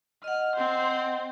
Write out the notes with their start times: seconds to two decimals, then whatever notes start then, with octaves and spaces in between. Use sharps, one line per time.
0.24 D#5 F#5 F6
0.56 C4 C5